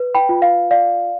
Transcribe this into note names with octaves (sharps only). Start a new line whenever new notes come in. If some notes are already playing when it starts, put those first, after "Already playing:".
Already playing: B4
G5 B5
F4
F5
D5 F5